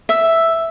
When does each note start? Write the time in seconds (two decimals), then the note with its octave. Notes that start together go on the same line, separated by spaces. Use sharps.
0.09 E5